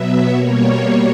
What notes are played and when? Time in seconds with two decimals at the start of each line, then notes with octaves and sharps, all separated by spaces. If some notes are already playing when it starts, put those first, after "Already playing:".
Already playing: B2 F#3 B3 E5
0.33 B2 G3 A#3 C#5